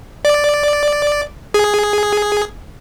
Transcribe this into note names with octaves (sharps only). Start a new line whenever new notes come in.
D5
G#4